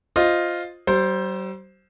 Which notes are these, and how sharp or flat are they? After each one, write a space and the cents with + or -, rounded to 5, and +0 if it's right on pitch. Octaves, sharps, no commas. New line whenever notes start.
F4 +0 C5 +0 D#5 +0
G3 -45 C5 +0